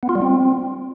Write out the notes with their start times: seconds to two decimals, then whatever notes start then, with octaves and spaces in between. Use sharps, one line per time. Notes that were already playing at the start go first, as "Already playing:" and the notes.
0.03 B3
0.09 F4
0.15 G3
0.22 C4